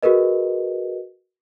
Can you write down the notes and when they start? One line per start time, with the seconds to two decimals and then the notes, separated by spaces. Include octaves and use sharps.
0.03 F#4 G#4 A#4 B4 D#5